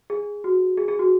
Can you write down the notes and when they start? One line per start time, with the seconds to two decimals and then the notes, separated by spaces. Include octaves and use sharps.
0.10 G#4
0.44 F#4
0.77 G#4
0.88 G#4
0.99 F#4